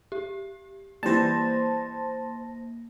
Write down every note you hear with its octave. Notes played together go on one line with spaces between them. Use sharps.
G4
E3 G3 A#3 C5 A5 A#6